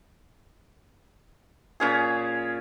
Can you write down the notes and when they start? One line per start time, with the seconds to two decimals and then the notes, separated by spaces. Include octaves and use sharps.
1.80 A#2 C#4 G#4